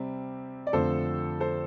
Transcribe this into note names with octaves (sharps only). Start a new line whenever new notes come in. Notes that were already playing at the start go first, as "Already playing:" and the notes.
Already playing: C3 G3 C4
D5
F2 D3 F3 A3 C4 A4 C5
A4 C5